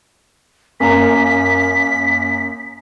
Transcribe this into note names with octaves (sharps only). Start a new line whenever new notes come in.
F#2 A#3 A#5 B6